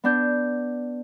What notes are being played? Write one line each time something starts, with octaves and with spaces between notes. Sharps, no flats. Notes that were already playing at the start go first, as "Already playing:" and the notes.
B3 D4 G6